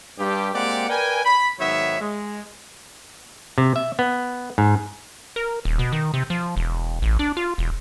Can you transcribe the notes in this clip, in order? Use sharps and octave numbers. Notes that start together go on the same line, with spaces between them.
G2 G3 G4
G#3 A#3 C4 G4 D5 F#5
A#4 B4 D5 G5 G#5
B5
G#2 D#3 F#3 B3 C#5 E5
G#3
C3
E5
B3
G#2
A#4
D#1
B2
D#3
C3
F3
E1
A1
D4
F4
E1